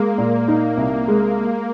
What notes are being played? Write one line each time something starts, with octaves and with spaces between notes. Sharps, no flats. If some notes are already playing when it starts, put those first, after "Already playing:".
Already playing: G#3 A#3
A#2
D#4
C2
G#3